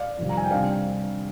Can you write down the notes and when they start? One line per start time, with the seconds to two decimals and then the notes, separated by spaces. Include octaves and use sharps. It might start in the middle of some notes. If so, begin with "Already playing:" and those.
Already playing: D5 F5
0.18 F2 C3 D#3 G3
0.29 A#5
0.37 G#5
0.44 G5
0.51 C3 G3 D4 D5 F5